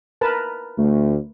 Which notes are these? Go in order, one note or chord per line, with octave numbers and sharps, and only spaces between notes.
A#4 B4 A5
D2 A3